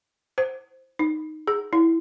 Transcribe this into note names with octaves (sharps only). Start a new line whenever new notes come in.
C5
D#4
G#4
E4